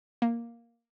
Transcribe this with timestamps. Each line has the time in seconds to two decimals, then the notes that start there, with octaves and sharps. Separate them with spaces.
0.22 A#3